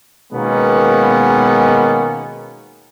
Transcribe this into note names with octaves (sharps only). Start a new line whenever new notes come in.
B2 D#3 G#3 A#3 B3 C#4